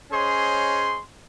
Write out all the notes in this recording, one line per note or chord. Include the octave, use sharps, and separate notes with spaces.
C#4 G#4 C5 C#5 D#5 C6